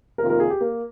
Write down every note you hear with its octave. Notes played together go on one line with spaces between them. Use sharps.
F2 C3 D#3 A#3 F4 A#4
A#4
G#4
G4
A#3